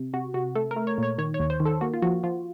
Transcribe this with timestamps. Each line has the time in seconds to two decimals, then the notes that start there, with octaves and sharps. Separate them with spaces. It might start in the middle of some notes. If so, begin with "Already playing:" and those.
Already playing: C3
0.13 C3 F#4
0.34 C3 F#4
0.55 A3 A4
0.71 A#4
0.76 A3
0.87 C#5
0.98 A#2 C#5
1.18 D#3 C#5
1.34 C#5
1.39 D#2
1.50 C5
1.60 D#3
1.65 A4
1.81 A#3 F#4
1.94 F4
2.02 F3 F#4
2.23 F3 F4